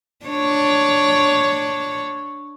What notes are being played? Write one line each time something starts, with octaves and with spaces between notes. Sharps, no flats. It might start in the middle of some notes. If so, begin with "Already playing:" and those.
D4 C#5